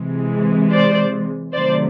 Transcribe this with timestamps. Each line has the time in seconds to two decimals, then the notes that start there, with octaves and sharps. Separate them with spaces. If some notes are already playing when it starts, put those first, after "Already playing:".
Already playing: C3 E3 G#3
0.72 C5 D5
1.53 C3 D#3 F#3 A3 C5 D5